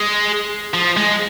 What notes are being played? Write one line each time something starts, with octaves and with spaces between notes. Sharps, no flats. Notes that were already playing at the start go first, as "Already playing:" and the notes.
Already playing: G#3
F3
G#3